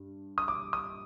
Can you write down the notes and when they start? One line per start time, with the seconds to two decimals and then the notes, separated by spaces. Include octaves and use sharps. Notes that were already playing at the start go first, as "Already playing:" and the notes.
Already playing: G2
0.38 D#6
0.48 D6
0.73 D#6